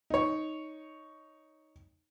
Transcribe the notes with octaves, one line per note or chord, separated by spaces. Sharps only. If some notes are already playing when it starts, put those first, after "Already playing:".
D#4 C#5